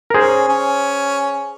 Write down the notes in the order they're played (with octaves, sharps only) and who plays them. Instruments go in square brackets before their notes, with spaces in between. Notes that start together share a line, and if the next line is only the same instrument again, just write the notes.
[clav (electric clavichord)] A#4
[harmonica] C#4 [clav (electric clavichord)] G#4 C5
[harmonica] C#4